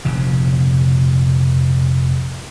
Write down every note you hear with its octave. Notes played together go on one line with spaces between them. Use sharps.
F1 A#2 C#3